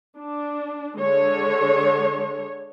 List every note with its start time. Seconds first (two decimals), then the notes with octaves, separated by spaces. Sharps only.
0.17 D4
0.97 D3 G#3 C#5